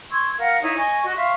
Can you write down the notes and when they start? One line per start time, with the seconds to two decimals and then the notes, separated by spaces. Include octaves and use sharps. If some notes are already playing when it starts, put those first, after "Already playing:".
0.11 C6 C#6 E6 G#6
0.38 A#4 F5 F#5
0.62 D#4 E4 C#5
0.77 D#5 G#5 C#6
1.03 F#4 D#5
1.16 E5 F5 C6 C#6